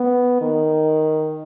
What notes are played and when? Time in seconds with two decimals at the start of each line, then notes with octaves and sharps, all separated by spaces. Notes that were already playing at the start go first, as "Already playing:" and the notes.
Already playing: B3
0.41 D#3